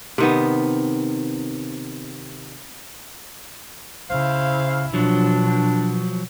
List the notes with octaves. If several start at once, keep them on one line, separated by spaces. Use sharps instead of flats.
C3 D#3 B3
C#3 E4 C5 F5
B2 F3 F#3 D4